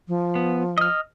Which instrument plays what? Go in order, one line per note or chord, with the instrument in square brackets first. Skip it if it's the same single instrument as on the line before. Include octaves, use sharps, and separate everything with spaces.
[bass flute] F3
[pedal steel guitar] B3
D#5 F6